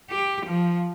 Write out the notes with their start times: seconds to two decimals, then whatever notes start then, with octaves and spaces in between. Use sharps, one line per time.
0.10 G4
0.45 F3